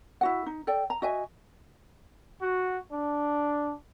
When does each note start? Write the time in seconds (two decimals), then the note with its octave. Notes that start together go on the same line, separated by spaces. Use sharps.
0.21 E4 F#4 F#5
0.46 D#4
0.67 A4 D5 G5
0.90 A#5
1.02 F#4 D#5 E5 G#5
2.42 F#4
2.92 D4